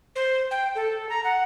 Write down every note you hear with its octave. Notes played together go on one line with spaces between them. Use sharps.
C5
G5
A4
A#5
F#5